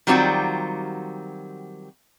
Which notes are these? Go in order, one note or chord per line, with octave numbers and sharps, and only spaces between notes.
D#3 F#3 G3 C4 F4 F#4